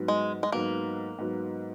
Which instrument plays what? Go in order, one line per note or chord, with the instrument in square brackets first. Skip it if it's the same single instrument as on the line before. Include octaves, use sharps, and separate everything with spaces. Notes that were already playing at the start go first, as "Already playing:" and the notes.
Already playing: [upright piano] G#2 F#3 B3
[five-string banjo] G#3
G#3
[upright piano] G#2 F#3 B3 [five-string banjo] A#3
[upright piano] G#2 F#3 B3